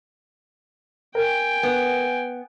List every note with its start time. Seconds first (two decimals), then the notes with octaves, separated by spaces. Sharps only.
1.15 A#4 G5 G#5
1.63 B3